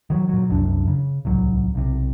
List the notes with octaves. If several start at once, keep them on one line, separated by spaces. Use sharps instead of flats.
D#3 F#3
A#2 F#3
F#1 C2 F#2 D4
C#3
D1 C2 F#3
B1 C3